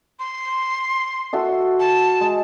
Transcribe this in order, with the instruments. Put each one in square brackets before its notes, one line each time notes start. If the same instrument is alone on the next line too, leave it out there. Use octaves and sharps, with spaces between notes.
[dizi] C6
[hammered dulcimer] F#4 A4 E5
[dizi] A5
[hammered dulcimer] G#3